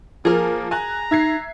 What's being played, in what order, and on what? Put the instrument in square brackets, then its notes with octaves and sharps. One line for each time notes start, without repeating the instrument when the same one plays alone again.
[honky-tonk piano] F3 [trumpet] A#3 [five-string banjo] G#4 A#4
[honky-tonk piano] G#5 F#6 [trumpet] A#5
[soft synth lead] D#4 [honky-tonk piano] E5 G#6 C7